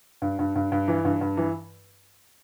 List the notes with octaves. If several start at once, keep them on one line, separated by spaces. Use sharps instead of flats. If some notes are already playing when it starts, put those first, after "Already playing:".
G2
G2
G2
G2
E3
G2
G2
E3